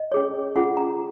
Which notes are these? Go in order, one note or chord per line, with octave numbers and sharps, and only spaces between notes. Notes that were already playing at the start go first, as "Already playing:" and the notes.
Already playing: D#5
C#4 G#4 C#5
C#4 F4 G#4 F#5
A#5